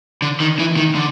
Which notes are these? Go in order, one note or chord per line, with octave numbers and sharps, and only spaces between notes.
D3
D#3
E3
D#3
D3